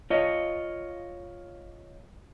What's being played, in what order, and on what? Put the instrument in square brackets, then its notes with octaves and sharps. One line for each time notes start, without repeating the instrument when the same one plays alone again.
[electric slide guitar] F4 C#5 D#5